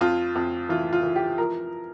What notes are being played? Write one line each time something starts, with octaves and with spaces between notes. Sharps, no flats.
F2 F4
F2
E3 F4
F4
E3
G4
F3 A#4